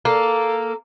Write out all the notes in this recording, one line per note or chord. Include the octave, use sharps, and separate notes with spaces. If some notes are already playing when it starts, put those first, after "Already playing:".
A#3 A4